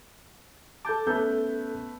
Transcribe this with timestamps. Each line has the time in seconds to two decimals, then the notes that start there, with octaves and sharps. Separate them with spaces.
0.85 A4 A5 D6 G6
1.07 A3 B3 C#4 A4 G6